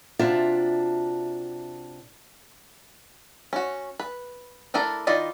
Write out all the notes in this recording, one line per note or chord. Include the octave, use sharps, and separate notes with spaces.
C3 D4 F4 F#4 E5 A5
C#4 F#4
B4
A3 D4 E4 A4 A#4
D#3 E4 F4 D5 D#5